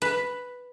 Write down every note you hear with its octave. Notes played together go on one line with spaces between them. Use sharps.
B4